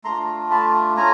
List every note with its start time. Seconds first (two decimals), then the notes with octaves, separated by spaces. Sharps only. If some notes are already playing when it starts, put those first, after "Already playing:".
0.04 A3 D4 F4 A#5 C6
0.51 A5 B5
0.97 A3 C#4 F4 G#5 A#5